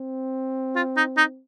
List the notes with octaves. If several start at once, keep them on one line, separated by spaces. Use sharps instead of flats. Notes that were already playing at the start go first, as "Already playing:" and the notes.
Already playing: C4
F4
D#4
D#4